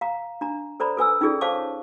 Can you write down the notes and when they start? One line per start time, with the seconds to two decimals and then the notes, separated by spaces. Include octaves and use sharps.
0.01 F5 A#5
0.41 D4 A#5
0.80 A4 C5 D5 A#5 B5
0.97 A4 B4 G#5 E6
1.21 C#4 D#4 F4 G#4 A4 D5
1.41 C5 C#5 F5 A5 C#6 D6